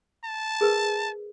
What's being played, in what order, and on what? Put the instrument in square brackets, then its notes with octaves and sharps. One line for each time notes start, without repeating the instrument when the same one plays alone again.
[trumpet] A5
[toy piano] G#4 A#4 B4